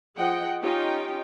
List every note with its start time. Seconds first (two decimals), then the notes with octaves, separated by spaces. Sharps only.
0.18 F3 G#4 D#5 F#5 G5
0.61 C#4 D#4 F4 G4 G5